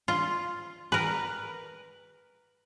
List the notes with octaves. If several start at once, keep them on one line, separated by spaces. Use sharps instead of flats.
F4
A#4 B4